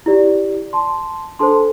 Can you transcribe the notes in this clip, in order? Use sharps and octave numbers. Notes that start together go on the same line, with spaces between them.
E4 G4 D5
A5 C6
D4 A4 C5 A5 C6